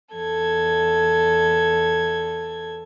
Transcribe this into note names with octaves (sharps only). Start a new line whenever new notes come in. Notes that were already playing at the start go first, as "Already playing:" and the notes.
E2 A4 G#6